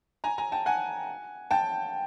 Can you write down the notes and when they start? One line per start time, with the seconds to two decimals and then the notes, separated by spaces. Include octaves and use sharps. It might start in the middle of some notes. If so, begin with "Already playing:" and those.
0.24 G#5 A#5
0.38 G#5 A#5
0.52 G5 A5
0.66 F#5 G#5
1.51 G5 A5